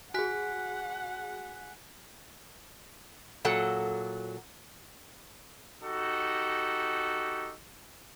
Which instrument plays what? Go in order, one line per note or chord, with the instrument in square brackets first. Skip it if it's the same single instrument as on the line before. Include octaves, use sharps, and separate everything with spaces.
[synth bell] F#4 G#4 [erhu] F#5 [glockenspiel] G#5 F#6 B6
[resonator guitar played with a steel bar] A#2 F#3 A4 F#5
[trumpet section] D#4 F#4 G4 A4